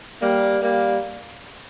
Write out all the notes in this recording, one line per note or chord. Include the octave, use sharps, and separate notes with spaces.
G3 A#3
G3 A#3